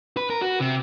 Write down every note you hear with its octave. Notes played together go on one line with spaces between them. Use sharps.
B4
A#4
F#4
C3